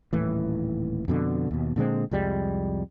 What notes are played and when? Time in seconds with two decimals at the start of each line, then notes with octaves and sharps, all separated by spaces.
0.13 D#1 A2 E3
1.08 F2 B2 D3
1.51 D#2 B2
1.76 A#2 D3 G#3 C4
2.11 C2 F2 G3 G#3